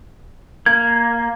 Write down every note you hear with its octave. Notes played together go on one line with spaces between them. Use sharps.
A#3 G#6